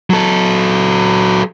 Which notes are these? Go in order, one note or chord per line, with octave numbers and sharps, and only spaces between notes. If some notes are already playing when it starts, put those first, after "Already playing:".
F#3 A4